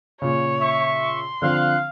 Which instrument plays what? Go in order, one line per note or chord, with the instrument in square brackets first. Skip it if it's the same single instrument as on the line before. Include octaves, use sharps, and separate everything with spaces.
[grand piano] A#2 C#3 [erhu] C#5
[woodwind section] E5 [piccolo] C#6
[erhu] C6
[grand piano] D3 F3 C4 [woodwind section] F5 [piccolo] F#6